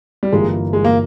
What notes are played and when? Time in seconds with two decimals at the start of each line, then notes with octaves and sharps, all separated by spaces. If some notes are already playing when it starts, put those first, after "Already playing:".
0.23 G3
0.32 G1 G2 E3 G#3 A#3 F4
0.73 G#3
0.84 A#3